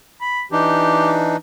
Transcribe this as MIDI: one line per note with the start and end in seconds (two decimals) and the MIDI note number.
0.21 0.41 83
0.52 1.36 52
0.52 1.36 62
0.52 1.36 63
0.52 1.12 67